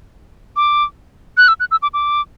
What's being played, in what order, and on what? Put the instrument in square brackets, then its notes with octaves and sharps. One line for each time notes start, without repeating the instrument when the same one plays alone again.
[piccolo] D6
F#6
E6
F#6
E6
D6
D6